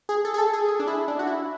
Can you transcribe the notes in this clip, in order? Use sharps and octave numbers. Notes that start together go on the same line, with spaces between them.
G#4
A4
G#4
A4
G#4
G#4
D4
E4
D4
F#4
E4